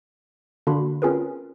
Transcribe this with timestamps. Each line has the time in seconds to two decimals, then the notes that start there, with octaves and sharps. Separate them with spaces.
0.67 D3 A#3 D4 F#4 B5 C6
1.02 C4 C#4 F4 G#4 A#4 B4